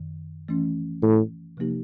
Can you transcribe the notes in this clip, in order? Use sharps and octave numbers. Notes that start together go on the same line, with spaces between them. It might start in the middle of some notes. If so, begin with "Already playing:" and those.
Already playing: F#2 D#3
E3 A3 C#4
A2
C3 F3 A#3 D#4 G4